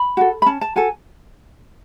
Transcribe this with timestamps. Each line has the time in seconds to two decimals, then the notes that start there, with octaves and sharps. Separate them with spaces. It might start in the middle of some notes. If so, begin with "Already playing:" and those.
Already playing: B5
0.17 F#4 A4
0.42 B5
0.46 C#4 A5
0.61 A5
0.76 F#4 A4 G#5